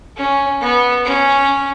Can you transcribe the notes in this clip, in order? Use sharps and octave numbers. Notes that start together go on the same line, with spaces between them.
C#4
B3
C#4